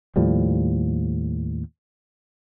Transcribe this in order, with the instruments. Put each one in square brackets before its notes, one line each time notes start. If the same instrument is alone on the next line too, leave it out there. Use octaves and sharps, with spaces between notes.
[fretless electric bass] D#2 A2 F3 G3